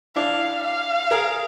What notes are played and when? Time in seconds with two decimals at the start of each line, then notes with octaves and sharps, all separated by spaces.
0.16 D4 E4 F5
0.64 F5
1.11 G#4 A#4